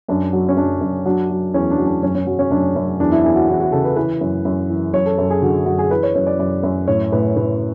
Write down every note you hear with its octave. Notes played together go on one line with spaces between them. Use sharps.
F#2 D4
F#3
C#4
F#2 D4
F#2
F#3 D4
F#3
E2 C#4
D4
F#3
D4
F#2 C#4
C#4
F#3
C#4
F#2 D4
F#2
E2 D4
E4
E2 E4
F#4
E2 F#4
F#4
C#3 A4
B4
E3 B4
F#2
F#2
E3
F#2 C#5
A4
F#2 A4
G#4
D3 F#4
F#2 F#4
G#4
E3 B4
C#5
F#2 C#5
D5
F#2 D5
F#2
A2 C#5
A2 B4
A2 B4